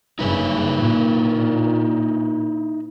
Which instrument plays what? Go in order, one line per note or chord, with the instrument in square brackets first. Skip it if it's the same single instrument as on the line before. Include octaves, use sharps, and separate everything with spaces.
[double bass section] F#1 G2 C#3 [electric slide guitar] D#4 E4 B4
[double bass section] A#2